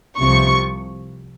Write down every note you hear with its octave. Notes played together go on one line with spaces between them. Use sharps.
C2 C3 F3 C#6